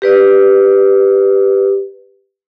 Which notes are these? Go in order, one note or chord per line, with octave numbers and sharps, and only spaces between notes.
G4 B4 D5